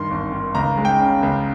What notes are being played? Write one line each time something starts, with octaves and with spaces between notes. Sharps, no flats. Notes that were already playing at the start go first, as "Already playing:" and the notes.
Already playing: G2 D#3 C6
G#1
D#3
C#2 A#5
G#3
G5
C#3
C#2